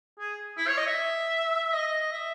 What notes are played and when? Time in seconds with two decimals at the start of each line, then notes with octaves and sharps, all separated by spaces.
0.19 G#4
0.57 E4
0.68 C#5
0.77 D#5
0.87 E5
1.73 D#5
2.12 E5